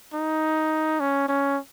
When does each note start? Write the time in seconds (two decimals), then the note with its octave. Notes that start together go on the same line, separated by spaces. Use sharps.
0.14 D#4
1.00 C#4
1.28 C#4